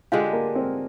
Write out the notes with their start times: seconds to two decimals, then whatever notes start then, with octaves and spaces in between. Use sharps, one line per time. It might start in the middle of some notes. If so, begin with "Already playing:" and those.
0.12 D3 G#3 D4 F4 G4
0.33 A#3
0.55 C4